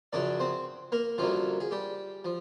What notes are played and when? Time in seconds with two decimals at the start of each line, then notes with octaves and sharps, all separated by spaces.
0.13 F#2 C#3 F3 D4 D5
0.40 C4 C5
0.92 A#3 A#4
1.18 F#2 D3 F3 G3 A#3 F4
1.60 G#4
1.71 G3 G4
2.25 F3